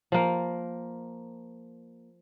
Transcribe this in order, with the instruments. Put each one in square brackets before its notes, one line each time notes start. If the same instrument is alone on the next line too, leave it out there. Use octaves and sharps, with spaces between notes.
[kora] F3 A#3